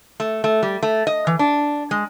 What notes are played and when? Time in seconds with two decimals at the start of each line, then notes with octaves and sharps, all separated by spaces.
0.20 A3
0.44 A3
0.63 G3
0.83 A3
1.07 D#5
1.27 E3
1.39 D4
1.91 G#3